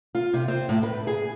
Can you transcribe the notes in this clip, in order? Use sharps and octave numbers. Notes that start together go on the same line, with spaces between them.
F4
C3
C4
A2
B4
G#4